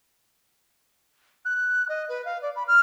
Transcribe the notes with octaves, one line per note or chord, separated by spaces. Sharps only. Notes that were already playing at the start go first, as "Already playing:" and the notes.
F#6
D#5
B4
F5
D5
B5
F6